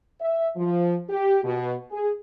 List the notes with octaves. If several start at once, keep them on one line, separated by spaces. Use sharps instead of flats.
E5
F3
G4
B2
G#4